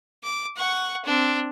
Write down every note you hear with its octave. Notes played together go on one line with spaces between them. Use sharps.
D6
F#5 C#6
C4 D4